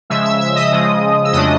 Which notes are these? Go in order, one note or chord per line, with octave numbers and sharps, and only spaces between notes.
C#3 F3 G#3 E5 E6
E5 E6
E5 E6
D#5 D#6
C#3 F3 G#3
E6
F2 C#3 F#3 A3 D4 D#5 D#6